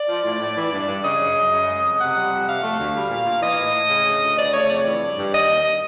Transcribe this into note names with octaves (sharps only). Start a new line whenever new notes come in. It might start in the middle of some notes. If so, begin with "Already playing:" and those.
Already playing: D5
F3
A2
A2
E3
G2
G2
C#3 D#5
F#2
F#2
C#3
G#3
F2
C3 F#5
G3
F2
C3 F5
A3
D2
G3
A#2
A#2
E3 D#5
A2
A2
C#3
D2
D2
C#3 D5
A3 C#5
F2 D5
E3
G2
G2
D#3 D#5
D#2